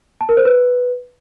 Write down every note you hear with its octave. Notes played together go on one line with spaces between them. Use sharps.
A5
A#4
C5
B4